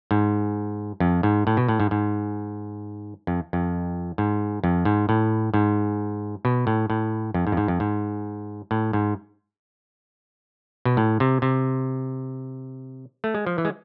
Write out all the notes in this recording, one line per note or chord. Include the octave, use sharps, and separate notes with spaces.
G#2
F2
G#2
A2
B2
A2
G#2
G#2
F2
F2
G#2
F2
G#2
A2
G#2
B2
A2
A2
F2
G#2
F2
G#2
F2
G#2
A2
G#2
B2
A2
C3
C3
A3
G#3
F3
E3
G#3